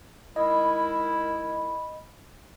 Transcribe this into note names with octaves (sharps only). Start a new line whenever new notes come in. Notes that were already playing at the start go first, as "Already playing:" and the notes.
D#3 G#3 E4 D#5 B5